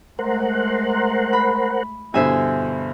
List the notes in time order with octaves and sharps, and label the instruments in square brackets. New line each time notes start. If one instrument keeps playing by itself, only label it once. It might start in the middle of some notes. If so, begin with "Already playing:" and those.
[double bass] G#3 A3 [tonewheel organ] A#4 C5 F#5
[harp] B5
[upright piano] G2 B2 D3 [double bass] E4 [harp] C5 E5 G#5